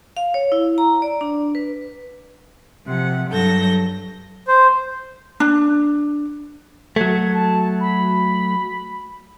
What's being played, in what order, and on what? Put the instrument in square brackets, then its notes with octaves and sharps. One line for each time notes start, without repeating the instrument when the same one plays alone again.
[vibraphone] F5
C#5
E4
A#5
D5
D4
B4
[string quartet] C3 F3 F#5
G2 F#3 A4 G6 A#6
[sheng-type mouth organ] C5
[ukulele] D4
[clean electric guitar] F#3 A3 [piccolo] G#6
[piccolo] A5
B5